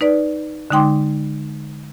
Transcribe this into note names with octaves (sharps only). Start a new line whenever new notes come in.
D#4 B4 D5
D3 G#3 D#4 G5 C6 D6